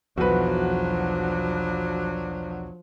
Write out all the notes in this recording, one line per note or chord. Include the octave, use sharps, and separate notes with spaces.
B1 E2 F3 F#3 D4 F#4 B4